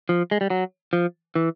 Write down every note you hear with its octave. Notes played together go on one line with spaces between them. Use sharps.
F3
G#3
G3
F#3
F3
E3